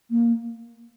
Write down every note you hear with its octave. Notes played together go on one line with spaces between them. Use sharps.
A#3